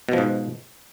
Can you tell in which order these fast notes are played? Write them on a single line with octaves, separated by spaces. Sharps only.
B2 F3 G#2